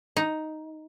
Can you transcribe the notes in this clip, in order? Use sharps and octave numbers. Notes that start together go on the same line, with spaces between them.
D#4